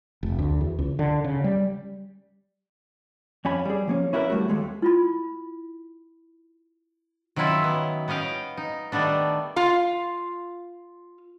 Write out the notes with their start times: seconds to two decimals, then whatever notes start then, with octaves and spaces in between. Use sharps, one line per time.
0.23 F1
0.39 D2
0.61 E2
0.79 C#2
0.99 D3
1.24 C#3
1.44 G3
3.45 F2 C#4 G#5 B5
3.65 G3 G#4
3.88 F3 A#3 C#4
4.13 C#4 E4 F#4 G4 A#4 B4
4.30 G3 A3 F#4
4.48 D#2 G#3 A3
4.82 E4 F4 B5
7.36 D#3 F#3 C#4 E4 F4 E5
7.62 F#3 B3
8.08 B3 C#4 D#5 F5 G5
8.57 D#4
8.92 D#3 G3 A3 B3 D4
9.56 F4 F5